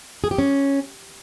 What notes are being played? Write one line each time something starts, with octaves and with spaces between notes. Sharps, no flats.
G#4
G4
C#4